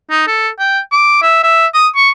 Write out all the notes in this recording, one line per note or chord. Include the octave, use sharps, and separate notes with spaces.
D#4
A4
G5
D6
E5
E5
D#6
C#6